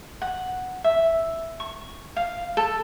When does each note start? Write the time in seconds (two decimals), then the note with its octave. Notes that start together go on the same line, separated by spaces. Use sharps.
0.22 F#5
0.84 E5
1.60 C#6
2.16 F5
2.57 A4